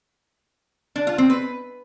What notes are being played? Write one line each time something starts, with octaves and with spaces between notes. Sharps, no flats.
D4
F4
C4
B4